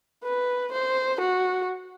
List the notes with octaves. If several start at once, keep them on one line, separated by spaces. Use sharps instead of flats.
B4
C5
F#4